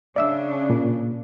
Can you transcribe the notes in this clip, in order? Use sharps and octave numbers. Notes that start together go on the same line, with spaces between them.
C#3 D4 D5 E5 E6
A#2